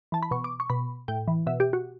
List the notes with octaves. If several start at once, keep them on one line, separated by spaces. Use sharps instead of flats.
E3 A5
B5
B2 C#6
D6
C#6
B2 B5
A2 G5
E3
B2 E5
G4
F#4